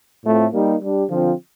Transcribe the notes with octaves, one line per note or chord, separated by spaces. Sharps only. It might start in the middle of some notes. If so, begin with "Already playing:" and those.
A2 A3 C4 F4
G3 A#3 D#4 G4
G3 D4 G4
D3 F3 C4 F4